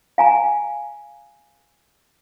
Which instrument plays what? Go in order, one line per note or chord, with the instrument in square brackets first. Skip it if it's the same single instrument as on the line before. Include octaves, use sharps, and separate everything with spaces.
[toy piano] F5 G#5 A#5